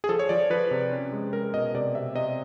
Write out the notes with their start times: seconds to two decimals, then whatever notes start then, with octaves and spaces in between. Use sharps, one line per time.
0.04 G#4
0.09 F3 A4
0.19 C#5
0.29 F3 D5
0.50 F3 B4
0.71 C3
0.92 C#4
1.13 G#3
1.33 G#3 A#4
1.54 B2 D#5
1.74 C3 D5
1.95 C3 E5
2.15 C3 D#5